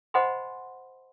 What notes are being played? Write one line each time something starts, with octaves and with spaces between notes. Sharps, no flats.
C5 D#5 F#5 G#5 B5 C6